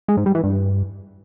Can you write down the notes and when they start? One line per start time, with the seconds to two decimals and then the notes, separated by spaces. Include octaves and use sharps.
0.08 G#3
0.17 G#2
0.26 G3
0.35 E3
0.44 G2